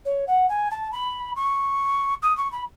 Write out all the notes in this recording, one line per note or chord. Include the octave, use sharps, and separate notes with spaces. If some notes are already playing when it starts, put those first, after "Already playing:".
C#5
F#5
G#5
A5
B5
C#6
D#6
C#6
B5